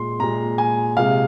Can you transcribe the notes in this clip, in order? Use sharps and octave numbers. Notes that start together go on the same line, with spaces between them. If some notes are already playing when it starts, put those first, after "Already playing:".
Already playing: A#2 G#3 C6
A#2 G#3 A#5
G#5
C3 G#3 F5